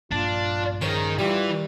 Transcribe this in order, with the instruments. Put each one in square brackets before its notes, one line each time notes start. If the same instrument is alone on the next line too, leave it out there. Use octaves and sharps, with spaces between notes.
[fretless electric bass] A#1 G2 A#3 [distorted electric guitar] D4 [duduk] F4
[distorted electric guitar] D#3 A#4 [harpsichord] C#4 C5 [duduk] G#4
[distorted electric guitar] E3 [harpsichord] G3 [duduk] F4